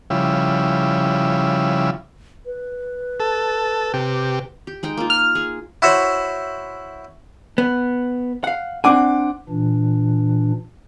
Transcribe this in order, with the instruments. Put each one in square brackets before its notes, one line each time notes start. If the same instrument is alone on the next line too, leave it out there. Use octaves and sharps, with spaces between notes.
[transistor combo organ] C#3 F3 G3 E4
[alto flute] B4
[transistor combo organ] A4
C3 G4
[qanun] G4
G#3 D#4 G5
A#3 F4
[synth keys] F6
[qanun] G#4
[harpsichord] E4 F#4 C5 C#5
[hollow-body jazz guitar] B3
F5 F#5
[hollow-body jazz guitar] C4 D4 G#5 [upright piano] F#5 D6
[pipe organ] A#2 E3 D4